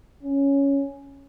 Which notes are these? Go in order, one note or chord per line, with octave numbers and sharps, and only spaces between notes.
C#4